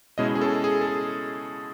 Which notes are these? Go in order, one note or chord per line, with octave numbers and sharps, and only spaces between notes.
B2 G#3 C#4 E4 D#5
G#4
A4
G#4
A4
G#4